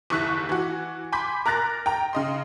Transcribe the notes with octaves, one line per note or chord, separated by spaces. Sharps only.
F#1 D#2 E4 C#6 F#6 B6
E3 F#4
G#5 B5 C6 D6 G6 B6
A#4 A#5 F#6 A6 A#6
G5 A#5
C#3 D#5 C6